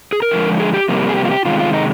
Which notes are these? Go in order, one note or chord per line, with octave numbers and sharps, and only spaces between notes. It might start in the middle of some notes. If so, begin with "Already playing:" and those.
G#4
A#4
D3 F3 G#3
G#4
G4
F2 C3 G3 A#3
G#4
G4
F4
G4
C3 D#3 G#3 F4
F4
D#4